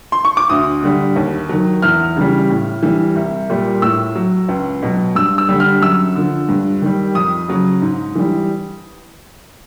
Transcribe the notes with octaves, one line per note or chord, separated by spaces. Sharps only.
C6
C#6
D6
D2 D#6
D3 G3
D#2
D#3 F#3
E2 F6
C#3 E3 G3
A2
E3 G3
C2
A#2 G3
A2 E6
F#3
C#2
B2 F#3
G2 E6
E6
D3 G3
F6
F#2 E6
D3 F3
G2
D#3 G3
F2 D#6
C#3 F#3
G#2
E3 G3